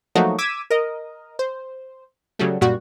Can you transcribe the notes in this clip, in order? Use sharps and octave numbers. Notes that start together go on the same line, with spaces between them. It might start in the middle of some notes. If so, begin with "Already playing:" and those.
F3 F#3 A3 A#3 D#4 F#4
D6 E6 G#6 B6 D#7 E7
A#4 D#5
C5
C#3 F#3 G3 A3
F#2 A#2 G3 F#4